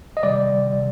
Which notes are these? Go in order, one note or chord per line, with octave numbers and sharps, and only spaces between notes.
D#5
C3 D#3 G3 D5
C3